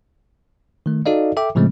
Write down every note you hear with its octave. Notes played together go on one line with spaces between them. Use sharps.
D#3 A3
D#4 F#4 A4 D5 D#5 F5
A4 E5 G5 D6
A2 C#3 F3 G#3 A3 C4